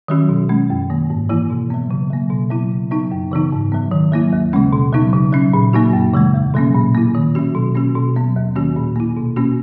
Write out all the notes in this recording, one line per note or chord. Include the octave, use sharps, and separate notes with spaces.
D#3 F#3 C#4 F#4
B2
G#3 C#4
F#2
D#3 A#3
G#2
E3 A#3 E4
B2
F#3 B3
C#3
F#3 A#3
B2
F#3 B3 E4
C#3
F#3 B3 D#4
F#2
C#3 E3 B3 D#4
G#2
F#3 B3
D#3
F#3 A#3 E4
D#2
C#3 G#3 C#4
B2
F#3 B3 D#4
C#3
F#3 C#4
A#2
F#3 A#3 D#4 F#4
F#2
C#3 E3 G#3
E2
B2 F#3 A#3 C#4
A#2
A#3 E4
D#3
F#3 C#4 F#4
B2
A#3 C#4 F#4
B2
F#3 B3
D#2
D#3 A#3 C#4 F#4
A#2
A#3 E4
B2
A#3 C#4 F#4